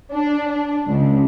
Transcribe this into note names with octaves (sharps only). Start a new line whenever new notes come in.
D4
D4
C#2